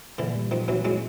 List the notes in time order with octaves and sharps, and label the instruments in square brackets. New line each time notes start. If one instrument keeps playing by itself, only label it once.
[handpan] A#2 [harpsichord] D3 E3
[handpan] G3
[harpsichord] D#3 F3 [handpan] D#4
[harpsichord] E3 F#3 [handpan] C4
[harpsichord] F#3 G#3 [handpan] E4